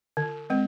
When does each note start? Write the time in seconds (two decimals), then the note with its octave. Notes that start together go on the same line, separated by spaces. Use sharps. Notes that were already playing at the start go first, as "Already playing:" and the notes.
0.17 D3
0.50 G#3 C4